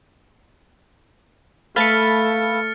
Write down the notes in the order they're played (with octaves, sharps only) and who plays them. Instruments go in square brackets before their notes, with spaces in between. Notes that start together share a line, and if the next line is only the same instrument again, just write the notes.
[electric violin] A3 A4 [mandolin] B4 F5 A5 [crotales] F6 A6 C#7